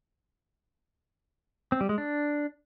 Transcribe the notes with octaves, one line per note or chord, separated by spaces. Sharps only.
C4
G3
G#3
D4